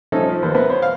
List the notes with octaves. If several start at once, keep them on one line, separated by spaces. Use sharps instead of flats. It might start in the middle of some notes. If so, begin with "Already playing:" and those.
F3 A3 C#4 D#4 A4
F3
D#2 F3 A#3 B4 C5
A#3 B3 E4 B4
C5 C#5
F5